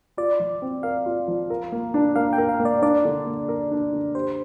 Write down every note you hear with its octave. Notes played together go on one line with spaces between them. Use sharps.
F4 D5
F3
C4
A#4 F5
F4
F3
A#4
A#3
D4
A#3 F5
G5
A#4
F5
A#3
D5
D4 D5
D3
A#3
A#4
D4
D3
G4 C5